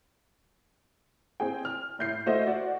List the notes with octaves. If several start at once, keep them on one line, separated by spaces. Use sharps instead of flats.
C4 G#4 G5
F6
A2 G6 C7
A3 F#4 C5 D#5
F#4 D5